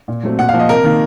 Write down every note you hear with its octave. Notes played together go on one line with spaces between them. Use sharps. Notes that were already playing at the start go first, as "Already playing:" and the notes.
A#2
F#3 A3 C4
A#2 F#5
F5
F3 A#3
D#5
C3 A#4
D#3 A#3